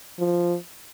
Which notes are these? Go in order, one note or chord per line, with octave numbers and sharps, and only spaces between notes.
F3